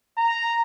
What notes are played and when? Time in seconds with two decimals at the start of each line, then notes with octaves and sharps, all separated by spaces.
0.17 A#5